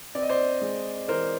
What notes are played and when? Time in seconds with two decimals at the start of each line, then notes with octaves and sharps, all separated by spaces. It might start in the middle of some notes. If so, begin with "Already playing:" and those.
0.15 C4 D5
0.22 D#5
0.29 C5 D5
0.62 G#3
1.08 E3 A#4 C5